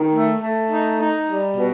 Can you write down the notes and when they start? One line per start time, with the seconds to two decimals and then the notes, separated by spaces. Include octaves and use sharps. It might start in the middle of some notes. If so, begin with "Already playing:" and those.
Already playing: D#3
0.12 A3
0.40 A3
0.70 D#4
0.99 D#4
1.28 G3
1.57 B2